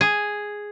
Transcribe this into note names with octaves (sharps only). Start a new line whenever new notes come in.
G#4